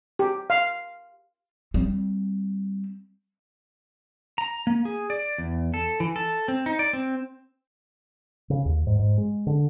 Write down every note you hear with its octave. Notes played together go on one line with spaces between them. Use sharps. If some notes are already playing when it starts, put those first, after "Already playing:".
G4
F5
G3 C4
A#5
A#3
G#4
D5
E2
A4
E3
A4
C4
D#4
D5
C4
C#3
D#2
G#2
G#2
G#3
D3